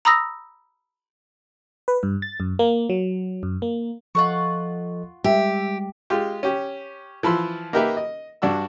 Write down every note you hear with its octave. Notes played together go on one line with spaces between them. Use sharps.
A#5 B5 D#6 E6 A#6
B4
G2
A6
F#2
A#3
F#3
F#2
A#3
F3 F4 A4 D#5 F#5 C#6
G3 G#3 G4 E5
G#3 F4 G4
C#4 G4
E3 F3 B5 C6 E6
A#3 D#4 G4 A#4 B4 E5
D#5
G2 D4 F#4 E6